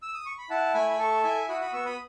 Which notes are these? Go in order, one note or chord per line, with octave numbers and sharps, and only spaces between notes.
E6
D#6
C#6
B5
E4 F#5 A5
A3 G#5 B5
B5
A4 A5 C#6
E4 E5 G#5
F#4 B5 D#6
B5 D#6
B3 C#6 E6
B5 D#6